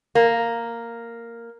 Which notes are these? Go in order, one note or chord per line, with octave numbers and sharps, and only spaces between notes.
A#3